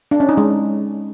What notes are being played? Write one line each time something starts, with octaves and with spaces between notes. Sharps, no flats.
D4
C#4
D#4
G#3